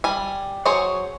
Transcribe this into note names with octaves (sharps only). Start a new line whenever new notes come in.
G3 G#5
F#3 F#4 G#4 C5 C#5